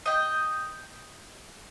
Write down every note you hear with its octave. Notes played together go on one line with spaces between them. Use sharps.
D#5 G5